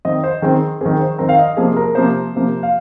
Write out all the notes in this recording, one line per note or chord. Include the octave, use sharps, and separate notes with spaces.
D#3 C4 D#5
C5
D#3 C4 G#4
D#3 C4 G#4
C5
D#3 C4 A#4
F5
D#5
C3 F3 A#3 G#4
A#4
C3 F3 A#3 C5
C3 F3 A#3
F5